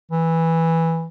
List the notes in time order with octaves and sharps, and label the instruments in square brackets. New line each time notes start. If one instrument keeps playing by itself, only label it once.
[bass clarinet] E3